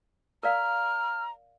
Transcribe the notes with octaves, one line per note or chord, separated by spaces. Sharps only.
A#4 D5 F5 A#5 F6